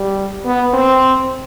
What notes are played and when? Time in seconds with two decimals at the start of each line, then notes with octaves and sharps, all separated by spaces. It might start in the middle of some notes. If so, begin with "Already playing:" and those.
Already playing: G3
0.45 B3
0.74 C4